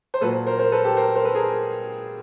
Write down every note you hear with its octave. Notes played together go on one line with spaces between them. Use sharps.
C5
A#2 F#3 A4 B4
A#4 C5
A#4 C5
A4 B4
G4 A4
A#4 C5
A#4 C5
A4 B4
G#4 A#4